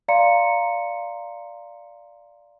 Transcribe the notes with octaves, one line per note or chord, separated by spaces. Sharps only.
D5 F5 A#5 C6 C#7